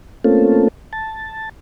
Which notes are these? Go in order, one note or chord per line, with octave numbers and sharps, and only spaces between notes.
A3 A#3 C4 C#4 F4 A4
A5